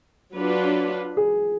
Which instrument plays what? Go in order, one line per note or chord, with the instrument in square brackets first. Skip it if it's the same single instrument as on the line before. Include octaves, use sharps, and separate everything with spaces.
[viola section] F#3 D4 F4 B4
[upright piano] G#4